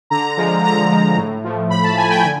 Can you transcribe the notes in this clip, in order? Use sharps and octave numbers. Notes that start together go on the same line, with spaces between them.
D3 A#5
F3 G#3
D3 A#5
F3 G#3
A2
F3 A3
A2 B5
A5
F3 A3 G#5
G5
D3 G#5